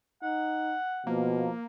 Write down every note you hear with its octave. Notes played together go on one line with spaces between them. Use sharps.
D#4 F#5
B2 F3 A#3